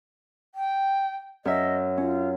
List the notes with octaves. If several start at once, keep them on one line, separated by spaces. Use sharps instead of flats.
G5
F#2 D#5 E5
C#4 F4